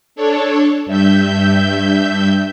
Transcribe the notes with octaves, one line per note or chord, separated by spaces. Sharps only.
D4 A4 C#5
G2 E5 G6